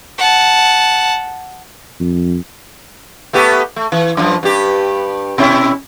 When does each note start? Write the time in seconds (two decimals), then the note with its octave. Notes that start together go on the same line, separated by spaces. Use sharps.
0.19 F#5 A5
2.00 F2
3.33 A3 B3 G4
3.76 A3
3.92 E3
4.17 F#2 F3
4.43 G2 G4
5.38 B2 C#4 E4